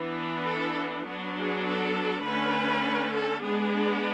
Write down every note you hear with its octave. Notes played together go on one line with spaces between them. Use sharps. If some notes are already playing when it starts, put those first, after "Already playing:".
Already playing: E3 B3 D4
A4
F#3 B3 D4
G#4
A4
D3 A3 C#4 B4
A4
G#3 B3 D4 G#4